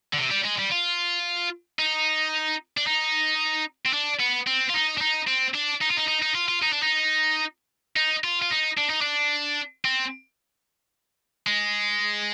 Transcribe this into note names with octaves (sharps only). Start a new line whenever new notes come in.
D3
C3
G3
G#3
G3
F4
D#4
D4
D#4
C4
D4
B3
C4
F4
D#4
D4
D#4
C4
D4
D#4
F4
D#4
D#4
D#4
F4
F4
D#4
D4
D#4
D#4
F4
F4
D#4
D4
D#4
D4
C4
G#3